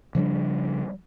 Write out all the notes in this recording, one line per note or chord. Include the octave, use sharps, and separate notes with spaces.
C#3 F3 G3 D4